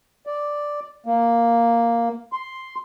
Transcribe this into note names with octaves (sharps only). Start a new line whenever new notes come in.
D5
A#3
C6